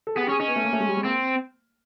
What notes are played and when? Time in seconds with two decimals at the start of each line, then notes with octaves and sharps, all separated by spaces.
0.07 A4
0.15 B3 G#4
0.23 G4
0.29 C#4
0.31 G#4
0.40 C#4 D#4
0.48 B3
0.56 A3
0.64 A#3
0.73 A3
0.80 G#3
0.88 G3
0.97 G#3
1.05 A#3 C4